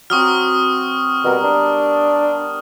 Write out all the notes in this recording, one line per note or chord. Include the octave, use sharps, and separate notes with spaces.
F#3 C4 F#4 C#6 D#6 F6
B2 G3 B3 A#4
D4